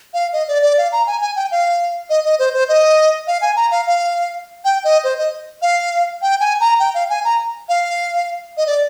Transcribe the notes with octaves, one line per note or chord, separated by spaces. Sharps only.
F5
D#5
D5
D5
F5
A#5
G#5
G#5
G5
F5
D#5
D#5
C5
C5
D#5
F5
G#5
A#5
F5
F5
G5
D#5
C5
D#5
F5
G5
G#5
A#5
G5
F5
G#5
A#5
F5
D#5
D5